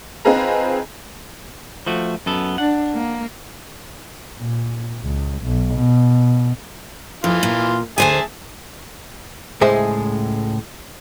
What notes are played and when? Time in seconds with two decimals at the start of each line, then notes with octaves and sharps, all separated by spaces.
0.25 C4 D#4 F4 G#4 B4 A#5
1.86 F3 A3 F#4
2.26 F#2 B3 A4
2.58 D4 F#5
2.94 A#3
4.38 A#2
5.02 C#2
5.43 B1
5.74 B2
7.24 F2 E3 F4
7.43 A#2
7.98 D2 G#4 C5 E5 G#5 A5
9.61 C#2 A2 G#3 G#4 C5 E5